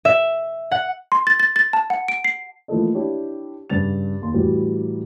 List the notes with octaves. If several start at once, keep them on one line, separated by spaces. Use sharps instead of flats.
E5
F#5
C6
A6
A6
A6
A5
F#5
D7
C7
E3 F3 A3 A#3 A4 D#5
D4 E4 G4 C#5
G2 C#3 A6 F7
D#2 C6
A2 E3 F#3 G3